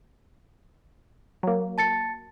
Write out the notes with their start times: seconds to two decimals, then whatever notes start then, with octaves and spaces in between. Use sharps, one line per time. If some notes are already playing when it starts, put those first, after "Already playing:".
1.43 F#3 A#3
1.78 A5 A6 C#7